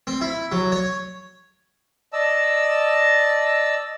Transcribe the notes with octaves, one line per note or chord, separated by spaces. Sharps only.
C4
E4
F#3
C#5
D5 D#5 A5 E6